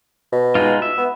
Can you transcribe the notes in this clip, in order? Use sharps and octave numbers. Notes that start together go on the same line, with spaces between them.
B2
G#3 D#4 F4
E5
B3